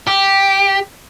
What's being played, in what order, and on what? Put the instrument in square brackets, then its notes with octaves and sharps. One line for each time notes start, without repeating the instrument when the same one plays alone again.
[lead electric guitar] G4